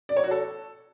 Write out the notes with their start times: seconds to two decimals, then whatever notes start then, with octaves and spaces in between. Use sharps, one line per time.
0.09 D5
0.16 C#5
0.24 F#4
0.31 A4